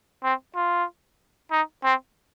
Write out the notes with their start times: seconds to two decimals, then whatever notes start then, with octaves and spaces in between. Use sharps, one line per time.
0.24 C4
0.56 F4
1.52 D#4
1.84 C4